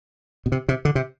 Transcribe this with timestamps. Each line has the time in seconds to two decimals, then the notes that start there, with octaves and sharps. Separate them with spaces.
0.46 B2
0.52 C3
0.69 C3
0.85 D3
0.95 C3